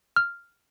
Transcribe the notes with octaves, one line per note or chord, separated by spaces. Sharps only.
F6